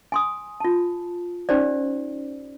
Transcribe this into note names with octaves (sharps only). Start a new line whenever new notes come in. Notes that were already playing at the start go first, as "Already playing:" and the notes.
G#5 C6 D#6
F4 A5
C#4 D#4 G4 C5 D5